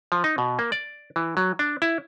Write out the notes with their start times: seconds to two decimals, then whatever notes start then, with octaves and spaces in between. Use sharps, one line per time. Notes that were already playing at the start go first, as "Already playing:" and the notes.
0.12 F3
0.24 D#4
0.38 B2
0.59 A#3
0.72 D5
1.16 E3
1.37 F#3
1.59 D4
1.82 E4